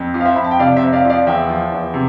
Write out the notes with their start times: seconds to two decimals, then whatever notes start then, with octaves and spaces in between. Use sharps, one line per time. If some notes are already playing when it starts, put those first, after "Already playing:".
Already playing: F2
0.14 F3
0.20 F5
0.25 C5 E5
0.36 F2 B5
0.44 A5
0.51 G5
0.59 C3 D5 F5
0.76 C5 E5
0.82 F2
0.93 D5 F5
1.05 F3
1.10 D5 F5
1.27 E2 E5 G5
1.49 F3
1.72 E2
1.94 C3